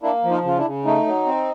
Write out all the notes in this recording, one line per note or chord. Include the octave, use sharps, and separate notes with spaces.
A#3 D4 E4
F3
D#4 F4
C#3 F4
D4 E4
C#3
A3 D#4
F#3
C4